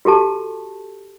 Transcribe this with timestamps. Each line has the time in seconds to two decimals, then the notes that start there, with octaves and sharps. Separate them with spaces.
0.05 F#4 G4 A4 A5